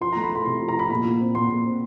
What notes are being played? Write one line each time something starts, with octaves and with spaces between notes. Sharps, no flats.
F3 C6
A3 A#5
B5
A3 C6
C3 C6
F3
A#5
F3 B5
A#2 B5
A#2
C4
A#2 C6
A#2
C4